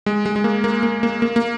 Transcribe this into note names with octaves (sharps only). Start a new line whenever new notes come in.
G#3
G#3
G#3
A#3
A#3
A#3
A#3
A#3
A#3